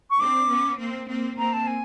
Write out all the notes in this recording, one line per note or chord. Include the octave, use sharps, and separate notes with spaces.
C#6
C4 D4 D6
B3 C#4
A#3 C4
A#3 C4
A#3 C4 A#5
A5
G#5